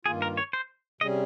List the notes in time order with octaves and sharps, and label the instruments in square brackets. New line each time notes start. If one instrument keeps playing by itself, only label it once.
[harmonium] G2 D#3 A#3 F4 [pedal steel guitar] G#4
[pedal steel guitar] A#4
C#5
C5
[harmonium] C3 G3 C#4 G#4 [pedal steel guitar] D#5